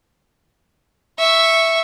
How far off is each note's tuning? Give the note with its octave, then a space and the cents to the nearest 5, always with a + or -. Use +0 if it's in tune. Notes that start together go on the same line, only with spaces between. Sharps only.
E5 +0 C#6 -5